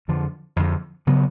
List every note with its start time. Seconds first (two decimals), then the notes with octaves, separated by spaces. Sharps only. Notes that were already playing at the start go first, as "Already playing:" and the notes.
0.08 F2 D3 F3
0.56 F2 D3 F3
1.07 C#3 F#3 B3